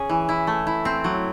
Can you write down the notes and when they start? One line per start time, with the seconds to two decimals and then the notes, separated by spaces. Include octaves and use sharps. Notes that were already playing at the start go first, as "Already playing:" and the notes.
Already playing: C#4 G#4
0.09 E3
0.29 E4
0.47 A3
0.67 E4
0.85 C4
1.04 F#3